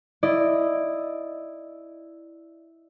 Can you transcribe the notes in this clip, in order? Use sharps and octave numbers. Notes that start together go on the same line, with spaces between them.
E4 D5 D#5